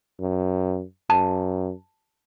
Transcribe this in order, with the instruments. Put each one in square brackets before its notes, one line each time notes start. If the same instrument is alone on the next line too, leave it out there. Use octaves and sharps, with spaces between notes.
[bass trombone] F#2
[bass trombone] F#2 [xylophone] A5